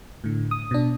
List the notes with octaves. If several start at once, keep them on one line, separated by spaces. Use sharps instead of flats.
A2 D3
D#6
B2 D4